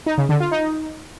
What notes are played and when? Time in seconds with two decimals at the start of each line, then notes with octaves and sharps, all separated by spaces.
0.06 D#4
0.18 C#3
0.29 D3
0.40 F4
0.51 D#4